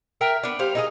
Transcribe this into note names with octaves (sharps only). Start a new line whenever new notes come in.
A#4 E5 G5
B3 D4
G3 C5 F5
D#4 E4 G#4